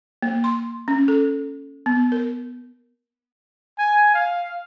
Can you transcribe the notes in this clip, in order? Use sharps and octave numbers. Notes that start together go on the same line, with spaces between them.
A#3
C6
C#4
A4
B3
A#4
G#5
F5